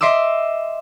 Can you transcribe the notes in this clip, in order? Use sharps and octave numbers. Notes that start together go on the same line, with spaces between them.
D#5 E5 C6 D6 E6